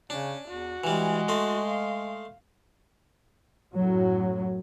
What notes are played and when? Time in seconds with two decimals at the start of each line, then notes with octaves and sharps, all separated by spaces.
0.10 C#3 C#4 D4
0.48 E2 F#4
0.84 E3 G3 G#3
1.28 A3 D#5 C6
1.67 F5
3.75 F#2 A2 F#3